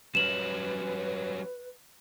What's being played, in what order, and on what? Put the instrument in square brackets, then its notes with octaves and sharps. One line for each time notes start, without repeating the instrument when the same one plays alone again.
[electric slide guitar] F#3 G3 C#4 [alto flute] B4 [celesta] E7 F#7